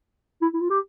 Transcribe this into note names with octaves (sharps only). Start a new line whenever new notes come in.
E4
E4
F4
G4